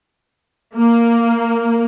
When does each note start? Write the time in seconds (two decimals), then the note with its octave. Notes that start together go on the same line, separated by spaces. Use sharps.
0.76 A#3